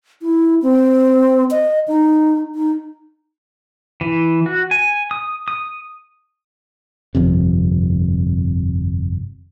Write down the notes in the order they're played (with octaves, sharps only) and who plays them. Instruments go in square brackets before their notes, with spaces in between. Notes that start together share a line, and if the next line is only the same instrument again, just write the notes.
[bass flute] E4
C4
D#5
D#4
D#4
[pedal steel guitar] E3
F#4
G#5
D#6
D#6
[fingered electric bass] G1 F2 C3